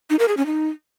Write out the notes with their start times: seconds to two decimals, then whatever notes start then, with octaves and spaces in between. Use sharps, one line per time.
0.10 D#4
0.19 A#4
0.28 G#4
0.37 C#4
0.46 D#4